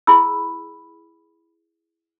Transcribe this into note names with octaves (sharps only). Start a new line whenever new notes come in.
E4 G#4 B5 E6